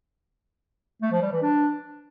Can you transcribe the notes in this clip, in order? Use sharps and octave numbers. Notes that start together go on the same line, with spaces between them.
A3
F3
G3
E3
D4